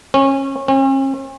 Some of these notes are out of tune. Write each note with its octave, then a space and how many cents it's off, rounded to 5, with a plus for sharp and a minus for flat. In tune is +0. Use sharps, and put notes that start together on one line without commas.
C#4 -25
C#4 -45